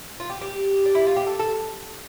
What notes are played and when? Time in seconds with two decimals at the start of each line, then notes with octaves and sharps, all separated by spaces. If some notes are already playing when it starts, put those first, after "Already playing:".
0.20 F4
0.30 G4
0.41 G4
0.85 D4
0.95 E4
1.07 F4
1.16 G4
1.27 A4
1.39 A4